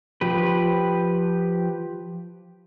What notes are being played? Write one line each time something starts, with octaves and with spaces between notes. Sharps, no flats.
F3 G4 B4